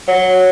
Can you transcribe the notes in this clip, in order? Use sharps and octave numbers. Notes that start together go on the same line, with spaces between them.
F#3